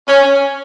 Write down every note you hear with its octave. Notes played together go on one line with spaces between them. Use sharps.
C#4